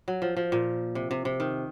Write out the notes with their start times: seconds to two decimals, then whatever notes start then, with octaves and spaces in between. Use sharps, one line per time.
0.08 F#3
0.22 F3
0.37 F3
0.52 A#2
0.95 C3
1.11 C3
1.25 C3
1.40 D#3